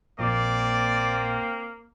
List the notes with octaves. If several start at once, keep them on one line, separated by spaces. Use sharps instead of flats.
A#1 A#2 A#3 C4 D5 D6